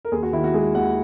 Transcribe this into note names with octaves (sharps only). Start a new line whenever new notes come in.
A#4
D#2 G#4
F#4
D#3 E4
F#4
G#3 G#4
D#2 F#5